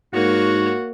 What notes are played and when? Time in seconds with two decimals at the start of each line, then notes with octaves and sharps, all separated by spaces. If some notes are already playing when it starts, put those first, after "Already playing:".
0.13 G#2 A#3 F#4 C#5